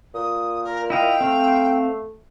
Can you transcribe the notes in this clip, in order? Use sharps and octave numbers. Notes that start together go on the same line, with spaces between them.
A#2 D#6
A#4
E4 D#5 F5 G5
A3 C4 F5